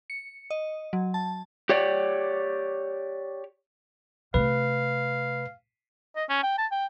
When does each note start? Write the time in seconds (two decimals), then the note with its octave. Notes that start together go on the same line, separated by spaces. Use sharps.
0.10 C#7
0.50 D#5
0.93 F#3
1.14 A5
1.69 G4 C#5 D5
4.34 C3 A3 B4 F5
6.16 D#5
6.29 C#4
6.43 G5
6.58 A5
6.71 G5